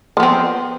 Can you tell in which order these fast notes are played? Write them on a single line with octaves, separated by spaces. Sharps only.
F3 B3 C4